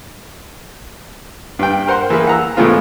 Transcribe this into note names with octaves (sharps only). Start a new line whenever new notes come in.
G2 G5
A#4 C5 F#5 C6
E3 A#3 G#4 B4
F#5 A#5 E6
A2 E3 G#3 A3 B3 F4